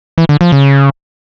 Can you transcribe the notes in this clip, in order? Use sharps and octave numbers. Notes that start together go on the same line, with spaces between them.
E3
D3
F3
C#3